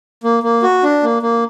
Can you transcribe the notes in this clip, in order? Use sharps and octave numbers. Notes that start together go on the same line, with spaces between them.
A#3
A#3
F#4
D4
A#3
A#3